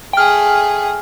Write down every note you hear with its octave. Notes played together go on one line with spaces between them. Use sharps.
A3 G#4 G5 F6